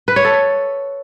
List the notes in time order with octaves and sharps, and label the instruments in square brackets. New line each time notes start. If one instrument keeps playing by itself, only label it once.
[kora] B4
C#5
A4